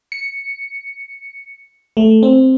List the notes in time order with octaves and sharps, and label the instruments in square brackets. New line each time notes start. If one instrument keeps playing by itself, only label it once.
[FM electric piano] C#7
A3
C4